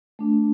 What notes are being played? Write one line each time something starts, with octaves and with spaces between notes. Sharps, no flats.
A3 D4